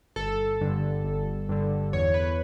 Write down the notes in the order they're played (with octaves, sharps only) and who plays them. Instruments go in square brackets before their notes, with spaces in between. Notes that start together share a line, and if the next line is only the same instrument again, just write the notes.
[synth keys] G1 A4
G2 D3
G1
G2 D3
E2 C#5
B4